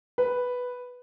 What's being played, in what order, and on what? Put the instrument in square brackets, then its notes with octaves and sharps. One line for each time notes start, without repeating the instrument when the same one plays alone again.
[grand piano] B4